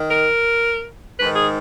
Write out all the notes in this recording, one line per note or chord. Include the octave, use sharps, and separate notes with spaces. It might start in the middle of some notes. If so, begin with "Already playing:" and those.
Already playing: D#3
A#4
G#2 D#3 B4
G#4